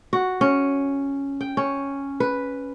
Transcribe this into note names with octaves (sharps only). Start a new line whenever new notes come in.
F#4
C#4
G5
C#4
B4